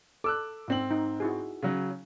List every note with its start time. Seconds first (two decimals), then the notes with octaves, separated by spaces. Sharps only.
0.24 A4 D6 E6 F#6
0.68 G#2 C4 F#7
0.91 D#4
1.20 E4 F#4 G#4
1.63 C#3 F#3